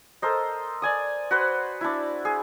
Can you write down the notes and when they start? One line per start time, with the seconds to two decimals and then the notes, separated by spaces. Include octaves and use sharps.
0.22 A4 A#4 C5 D#5
0.82 D5 G#5 D#6
1.31 F#4 B4 C5
1.81 D4 E4
2.25 G#4